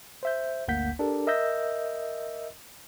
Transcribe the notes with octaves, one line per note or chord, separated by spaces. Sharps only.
C5 E5 G6
G1 D2 A#3 F#5 G6 B6
D4 G4 A4 A#4
A#4 D#5 E5 E6 G6 A#6